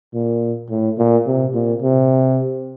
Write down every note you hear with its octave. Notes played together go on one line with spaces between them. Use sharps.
A#2
A2
A#2
C3
A#2
C3